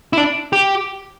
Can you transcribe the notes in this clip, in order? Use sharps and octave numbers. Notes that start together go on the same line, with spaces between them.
E4
D4
G4